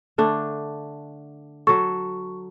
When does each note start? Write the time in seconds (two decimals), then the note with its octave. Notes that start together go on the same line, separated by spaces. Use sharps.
0.18 D3 A3 D4
1.67 F#3 A4 C#6